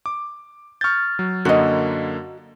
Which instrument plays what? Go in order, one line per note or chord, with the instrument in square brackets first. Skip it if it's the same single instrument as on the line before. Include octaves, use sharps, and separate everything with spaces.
[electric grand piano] D6
[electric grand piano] C#6 G6 [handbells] F6 A6
[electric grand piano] F#3
[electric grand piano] F#2 D3 A#3 [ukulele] F#4 D#5